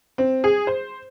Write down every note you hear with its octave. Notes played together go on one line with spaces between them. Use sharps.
C4
G#4
C5